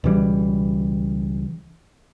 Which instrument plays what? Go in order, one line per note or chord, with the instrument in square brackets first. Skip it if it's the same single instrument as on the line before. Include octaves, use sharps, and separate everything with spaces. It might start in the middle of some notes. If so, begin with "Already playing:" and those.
[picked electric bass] C#2 B2 E3 G3